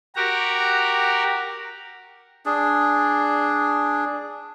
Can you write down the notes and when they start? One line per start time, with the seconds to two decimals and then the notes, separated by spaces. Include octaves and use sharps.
0.16 F#4 G4 A#4 A#5
2.46 D4 G#4